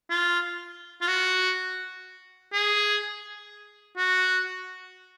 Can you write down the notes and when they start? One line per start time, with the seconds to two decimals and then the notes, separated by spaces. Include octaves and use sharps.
0.10 F4
1.02 F4
1.08 F#4
2.53 G#4
3.97 F#4